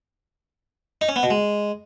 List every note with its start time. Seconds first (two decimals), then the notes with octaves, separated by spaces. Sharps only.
1.01 D#4
1.09 C#4
1.16 B3
1.23 B2
1.30 G#3